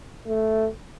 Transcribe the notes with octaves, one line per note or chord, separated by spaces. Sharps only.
A3